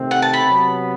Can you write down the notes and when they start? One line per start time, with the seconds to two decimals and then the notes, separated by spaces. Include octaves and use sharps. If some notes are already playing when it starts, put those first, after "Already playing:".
Already playing: C3 D#3 A3 C4
0.11 F#5
0.22 A5
0.33 B5
0.45 C3 F#3 B3